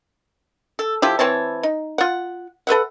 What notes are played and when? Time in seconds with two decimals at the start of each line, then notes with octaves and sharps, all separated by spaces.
0.79 A4
1.02 F3 E4 G4
1.19 E3 C4 C#5 A5
1.63 D#4
1.98 F4 F#5
2.67 A4 B4 E5 F#5